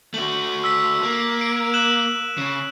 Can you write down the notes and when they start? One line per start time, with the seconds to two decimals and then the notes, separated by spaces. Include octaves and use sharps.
0.14 A3 F#4 F#7
0.64 E6 B6
1.03 A#3
1.41 D7
1.74 F#6 E7 F#7
2.38 C#3